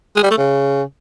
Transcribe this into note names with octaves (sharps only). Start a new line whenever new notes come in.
G#3
G3
A3
C#3